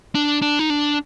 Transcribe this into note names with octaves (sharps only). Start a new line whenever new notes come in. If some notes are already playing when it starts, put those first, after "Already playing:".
D4
D4
D#4
D4